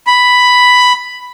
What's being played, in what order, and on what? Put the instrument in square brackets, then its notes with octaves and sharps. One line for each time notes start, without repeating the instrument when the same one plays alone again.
[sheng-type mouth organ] B5